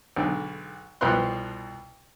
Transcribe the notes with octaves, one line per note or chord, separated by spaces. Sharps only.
B1 G#2 D3
C2 B2 F3 B3 C6 F#6